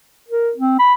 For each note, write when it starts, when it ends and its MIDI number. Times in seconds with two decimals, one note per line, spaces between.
0.28 0.51 70
0.57 0.75 60
0.79 0.93 83